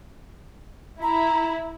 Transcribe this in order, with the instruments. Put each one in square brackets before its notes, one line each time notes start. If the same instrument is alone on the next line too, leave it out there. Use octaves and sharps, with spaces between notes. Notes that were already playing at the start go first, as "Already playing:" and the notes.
[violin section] E4 [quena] A#5